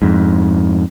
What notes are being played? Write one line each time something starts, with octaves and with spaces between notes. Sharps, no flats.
F2 G#2